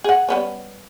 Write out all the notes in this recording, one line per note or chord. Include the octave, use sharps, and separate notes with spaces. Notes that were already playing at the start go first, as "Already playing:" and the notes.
G#4 F#5
G3 B3 C#4